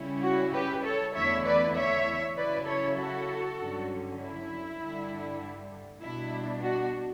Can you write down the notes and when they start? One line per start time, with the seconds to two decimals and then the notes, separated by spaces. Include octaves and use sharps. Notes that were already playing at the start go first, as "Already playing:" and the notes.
Already playing: C#3 G3 C#4 E4
0.22 F#4
0.53 G4 B4
0.83 A4 C#5
1.14 E2 D3 A3 E4 C#5 E5
1.45 B4 D5
1.75 C#5 E5
2.36 C#3 F#3 C#4 E4 B4 D5
2.66 A4 C#5
2.97 F#4 A4
3.58 G2 D3 F#3 C#4
4.18 E4
4.80 G2 D3 G3
6.02 B2 G3 D4 E4
6.63 F#4